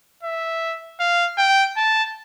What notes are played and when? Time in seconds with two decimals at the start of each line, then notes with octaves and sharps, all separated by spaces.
0.23 E5
1.00 F5
1.38 G5
1.77 A5